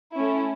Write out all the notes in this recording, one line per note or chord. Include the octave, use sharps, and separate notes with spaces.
A3 C#4 E4